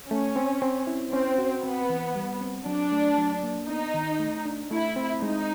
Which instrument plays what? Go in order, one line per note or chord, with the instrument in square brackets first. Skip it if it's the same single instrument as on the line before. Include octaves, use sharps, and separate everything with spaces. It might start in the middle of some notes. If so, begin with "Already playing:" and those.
[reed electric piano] A3 [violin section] C#4
[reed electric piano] C4
C4
E4
[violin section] C4 [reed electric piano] C#4
[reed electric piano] F#4
[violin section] B3 [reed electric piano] C4
[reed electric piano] E3
G3
C4
[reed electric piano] F#3 [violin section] D4
[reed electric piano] A3
F#3
A#3
[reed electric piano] B3 [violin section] D#4
[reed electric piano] D#3
A3
D4
[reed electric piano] A3 [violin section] E4
[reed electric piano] C4
[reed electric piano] G#3 [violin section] D#4